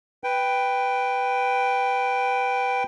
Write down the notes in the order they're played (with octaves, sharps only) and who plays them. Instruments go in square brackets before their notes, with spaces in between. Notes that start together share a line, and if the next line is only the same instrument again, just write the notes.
[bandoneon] B4 G5